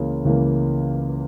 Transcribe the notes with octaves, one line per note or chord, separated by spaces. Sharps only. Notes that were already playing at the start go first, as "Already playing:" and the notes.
Already playing: C#2 C#3 E3 A#3
C#2 C#3 E3 A#3